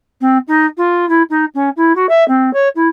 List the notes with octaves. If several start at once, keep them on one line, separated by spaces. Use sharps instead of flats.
C4
D#4
F4
E4
D#4
C#4
E4
F#4
E5
C4
C#5
E4